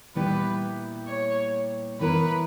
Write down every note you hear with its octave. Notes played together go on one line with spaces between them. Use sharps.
A#2 G3 B3 E4 G4 B4
C#5
E3 B3 E4 A#4 B4